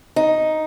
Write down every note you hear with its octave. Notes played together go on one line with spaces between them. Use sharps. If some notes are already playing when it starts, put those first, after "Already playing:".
D#4